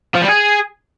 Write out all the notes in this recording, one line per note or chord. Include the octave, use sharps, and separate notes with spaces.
F3
G3
G#4